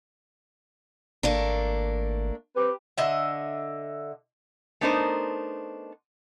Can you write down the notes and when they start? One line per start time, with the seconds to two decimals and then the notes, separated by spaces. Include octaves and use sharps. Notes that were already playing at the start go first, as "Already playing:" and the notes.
1.23 G#1 A3 A#3 D4
2.56 C4 G4 B4
2.98 D3 D#5 E5
4.81 A3 B3 D4 D#4 A#4 C5